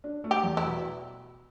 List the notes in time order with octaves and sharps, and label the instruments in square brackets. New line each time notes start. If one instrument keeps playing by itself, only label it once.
[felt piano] D4
A3
[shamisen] G4
[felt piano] E2
[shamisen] E4
[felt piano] B2